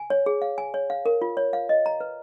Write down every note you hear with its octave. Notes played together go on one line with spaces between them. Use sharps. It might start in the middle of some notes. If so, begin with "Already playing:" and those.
Already playing: G#5
C#5
G#4
F5
G#5
C#5
F5
A#4
F4
C#5
F5
D#5
A#5
B4